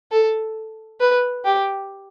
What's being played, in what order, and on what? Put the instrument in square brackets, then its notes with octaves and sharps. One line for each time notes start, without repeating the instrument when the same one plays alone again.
[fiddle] A4
B4
G4